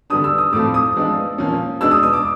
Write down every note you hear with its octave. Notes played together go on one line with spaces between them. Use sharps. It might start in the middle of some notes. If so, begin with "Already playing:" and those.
D3 G3 B3 D4 D#6
E6
D#6
A2 F3 A3 C4 D6
D#6
F3 G#3 B3 D4
A#2 F3 A#3 C#4
B2 G#3 B3 D4 E6
D#6
D#6
D6